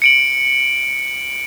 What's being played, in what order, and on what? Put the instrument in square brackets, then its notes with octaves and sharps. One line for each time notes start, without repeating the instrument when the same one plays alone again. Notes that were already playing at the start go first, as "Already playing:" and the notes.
[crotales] C#7 D7 F#7